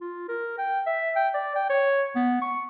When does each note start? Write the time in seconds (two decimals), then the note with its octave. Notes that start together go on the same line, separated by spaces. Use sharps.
0.01 F4
0.29 A#4
0.58 G5
0.87 E5
1.16 G5
1.34 D5
1.56 G5
1.70 C#5
2.16 B3
2.41 C#6